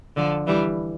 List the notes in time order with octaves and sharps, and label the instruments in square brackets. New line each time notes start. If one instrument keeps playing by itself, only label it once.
[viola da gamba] D3 F3
E3 G3